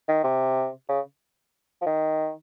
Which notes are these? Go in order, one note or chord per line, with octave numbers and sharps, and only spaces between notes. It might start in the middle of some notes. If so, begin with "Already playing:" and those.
D#3
C3
C#3
F3
D#3